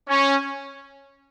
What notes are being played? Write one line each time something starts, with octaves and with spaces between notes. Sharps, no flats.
C#4